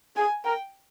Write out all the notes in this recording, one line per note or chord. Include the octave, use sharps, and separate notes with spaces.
G#4 G#5
A#4 G5